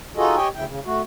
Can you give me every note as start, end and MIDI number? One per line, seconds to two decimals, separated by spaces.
0.17 0.36 63
0.17 0.36 65
0.17 0.36 66
0.17 0.36 68
0.17 0.36 69
0.17 0.36 75
0.36 0.48 67
0.36 0.48 73
0.36 0.48 75
0.36 0.48 79
0.36 0.48 80
0.55 0.65 38
0.55 0.65 49
0.55 0.65 64
0.55 0.65 79
0.66 0.80 49
0.85 1.02 57
0.85 1.02 66